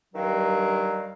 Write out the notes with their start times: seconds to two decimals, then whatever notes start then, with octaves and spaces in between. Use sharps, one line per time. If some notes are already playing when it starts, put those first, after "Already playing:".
0.15 G2 D#3 F#3 G3 F5